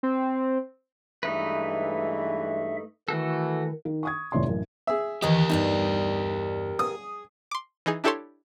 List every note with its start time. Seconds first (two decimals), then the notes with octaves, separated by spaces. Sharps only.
0.03 C4
1.23 G2 E3 G#3 A3 D#4 B4 E5
3.09 D#3 E3 A3 F#4 A4
3.85 D#3
4.03 C#6 D#6 G#6
4.32 F1 A2 C3 C#5 D5 C6
4.47 A1 F#2
4.87 G#4 E5
5.22 D#2 D#3 E3 G4 A#4 D#5
5.50 E2 G2 D4 D#4
6.79 G#4 D#6
7.51 C6 D6
7.86 E3 D#4 G#4
8.04 D4 E4 G4 A4 C#5 C6